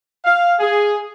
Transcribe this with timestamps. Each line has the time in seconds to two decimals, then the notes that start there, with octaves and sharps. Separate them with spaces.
0.25 F5
0.60 G#4